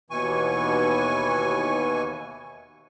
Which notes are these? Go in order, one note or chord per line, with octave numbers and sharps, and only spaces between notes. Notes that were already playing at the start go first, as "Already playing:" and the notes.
D#2 B2 E3 G#5 C#6